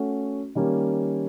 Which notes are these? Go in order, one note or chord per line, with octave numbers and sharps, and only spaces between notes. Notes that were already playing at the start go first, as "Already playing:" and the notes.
Already playing: A3 C#4 F#4
D#3 G3 A#3 C#4